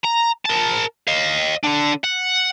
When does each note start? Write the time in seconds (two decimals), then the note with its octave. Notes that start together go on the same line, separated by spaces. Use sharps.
0.04 A#5
0.45 A#4 A5
1.08 D#5 F5
1.65 D3 D4
2.04 F#5